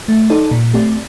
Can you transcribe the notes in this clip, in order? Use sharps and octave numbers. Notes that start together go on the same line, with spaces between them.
A3
D#4 A4 D5
A#2
A3 C4 G4 D5